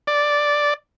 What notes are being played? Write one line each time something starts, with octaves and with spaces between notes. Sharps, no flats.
D5